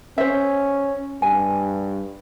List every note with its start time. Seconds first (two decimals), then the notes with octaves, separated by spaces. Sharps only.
0.18 C#4 C5 E5
1.22 G2 G#5